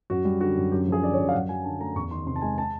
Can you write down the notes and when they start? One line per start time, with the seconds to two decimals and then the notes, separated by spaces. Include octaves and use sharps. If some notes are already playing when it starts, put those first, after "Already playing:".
0.10 F#2 F#4
0.25 G3
0.41 D3 F#4
0.56 F#2
0.72 F#2 G4
0.88 F3 G#4
1.02 D3 D5
1.14 C#5
1.18 F#2
1.29 F5
1.33 F#2 F#5
1.49 F#3 G#5
1.65 D3 A5
1.80 A3 A#5
1.95 E2 C#6
2.11 D#3 C6
2.26 C3 C6
2.36 A5
2.42 G#3 G#5
2.58 A5